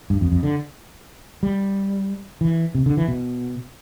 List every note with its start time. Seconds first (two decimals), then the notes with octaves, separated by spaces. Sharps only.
0.10 G2
0.21 F2
0.32 F2
0.43 D3
1.43 G3
2.41 E3
2.75 C3
2.86 D3
2.97 E3
3.08 B2